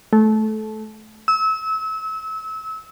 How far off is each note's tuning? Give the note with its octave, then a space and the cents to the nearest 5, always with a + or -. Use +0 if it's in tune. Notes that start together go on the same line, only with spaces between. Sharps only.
A3 -20
E6 -30